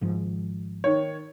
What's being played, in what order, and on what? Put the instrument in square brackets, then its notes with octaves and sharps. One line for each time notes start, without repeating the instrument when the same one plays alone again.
[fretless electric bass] G#1 G#2 F3
[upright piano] D#3 C#5